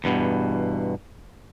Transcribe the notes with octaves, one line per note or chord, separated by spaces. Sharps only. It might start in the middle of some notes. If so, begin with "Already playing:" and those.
E2 G2 B2